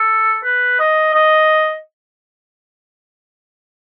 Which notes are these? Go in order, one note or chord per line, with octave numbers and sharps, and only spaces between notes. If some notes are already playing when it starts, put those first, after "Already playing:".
Already playing: A4
B4
D#5
D#5